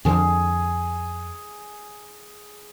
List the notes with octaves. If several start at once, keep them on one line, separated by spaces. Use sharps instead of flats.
F2 D3 F3 G#4